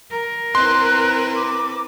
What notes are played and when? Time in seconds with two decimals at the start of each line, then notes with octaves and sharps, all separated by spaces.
0.11 A#4
0.55 C4 E4 B4 C6 F#6
1.36 D6